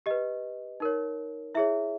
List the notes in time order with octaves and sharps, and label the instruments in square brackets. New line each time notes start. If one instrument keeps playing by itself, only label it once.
[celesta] G4 B4 D#5
D#4 A#4 C#5
E4 G#4 C#5 E5